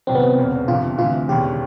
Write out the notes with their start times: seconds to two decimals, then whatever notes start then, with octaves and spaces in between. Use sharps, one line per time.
0.07 C2 C3 D#3 F#3 C4
0.15 B3
0.22 C4
0.38 E1 E2 C#3
0.68 G1 F2 C3 F3 F4
0.98 D2 C3 E3 F4
1.28 E1 D#2 C#3 G4